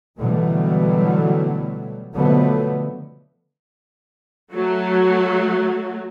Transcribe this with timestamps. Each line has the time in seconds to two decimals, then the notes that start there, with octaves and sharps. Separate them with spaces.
0.18 B2 D3 E3 F#3 G3 A3
2.13 B2 D3 F3 F#3 A3 B3
4.51 F#3 A3